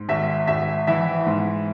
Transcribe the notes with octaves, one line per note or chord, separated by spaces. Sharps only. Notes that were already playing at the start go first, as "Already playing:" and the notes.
Already playing: G#2
G#1 E5
G#1 E5
E3 E5
G#2